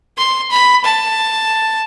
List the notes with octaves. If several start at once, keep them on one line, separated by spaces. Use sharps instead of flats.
C6
B5
A5